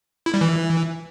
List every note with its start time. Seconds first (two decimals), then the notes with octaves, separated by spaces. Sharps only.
0.26 E4
0.34 G3
0.41 E3